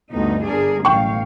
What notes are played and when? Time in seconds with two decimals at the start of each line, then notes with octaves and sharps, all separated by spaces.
0.11 D2 G2 B3 D#4
0.46 G1 D4 G#4 A#4
0.85 A1 F#2 B2 F5 G5 C#6